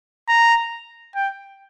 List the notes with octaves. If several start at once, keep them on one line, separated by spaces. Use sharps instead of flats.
A#5
G5